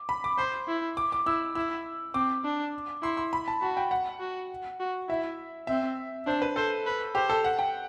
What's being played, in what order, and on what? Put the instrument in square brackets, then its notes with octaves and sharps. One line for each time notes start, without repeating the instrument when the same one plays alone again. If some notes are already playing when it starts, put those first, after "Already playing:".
Already playing: [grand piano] D6
B5
D6
[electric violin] C5 [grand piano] C6
[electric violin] E4
[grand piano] D6
D6
[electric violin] E4 [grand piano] E6
[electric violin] E4 [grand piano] E6
[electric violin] C4 [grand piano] D6
[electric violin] D4
[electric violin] E4 [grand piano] C6
[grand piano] C6
B5
A5
[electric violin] F#4 [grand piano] A5
[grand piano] G5
F#5
[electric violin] F#4
F#4
[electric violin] E4 [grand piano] E5
[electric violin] C4 [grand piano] E5
[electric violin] D4 [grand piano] C5
[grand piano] B4
[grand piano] A4 [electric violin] C5
[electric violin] B4
[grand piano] G4 [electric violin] C5
[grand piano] A4
F#5
G5